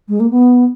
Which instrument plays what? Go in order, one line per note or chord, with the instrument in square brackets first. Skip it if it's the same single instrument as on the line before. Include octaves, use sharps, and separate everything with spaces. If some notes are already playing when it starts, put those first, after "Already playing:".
[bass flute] G#3
A#3
B3